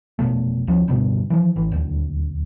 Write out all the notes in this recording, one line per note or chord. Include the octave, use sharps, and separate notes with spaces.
F1 B1 B2 A3
D2 F3 C#4
D1 D2 G2 B2
E3 F3
A1 E3
D#1 D2